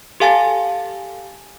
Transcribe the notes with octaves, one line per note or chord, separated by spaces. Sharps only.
G4 A4 F5 G#5 A5 A6